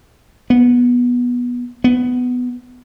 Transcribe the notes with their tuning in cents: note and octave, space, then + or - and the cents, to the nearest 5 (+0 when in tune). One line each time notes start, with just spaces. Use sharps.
B3 -15
B3 +10